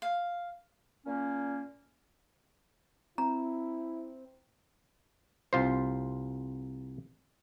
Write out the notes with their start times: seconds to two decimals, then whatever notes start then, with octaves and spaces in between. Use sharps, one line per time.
0.02 F5
1.06 A#2 A#3 C#4
3.18 C4 E4 A#5
5.53 C2 F4 C5